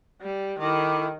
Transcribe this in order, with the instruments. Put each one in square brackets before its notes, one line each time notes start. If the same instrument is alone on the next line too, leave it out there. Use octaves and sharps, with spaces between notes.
[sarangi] G3
[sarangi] D#3 [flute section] E4 A4 D6